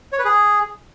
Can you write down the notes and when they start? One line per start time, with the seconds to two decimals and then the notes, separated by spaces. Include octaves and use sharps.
0.13 C#5
0.19 B4
0.25 G#4